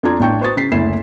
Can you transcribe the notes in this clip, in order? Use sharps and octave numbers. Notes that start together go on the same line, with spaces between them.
F2 D4 F4 D5 A#5 G#6
A1 D4 G5 C#6 G6
B4 C5 C#6 D#6 A6
C#3 B6 C7
F#1 D2 E4 C7 E7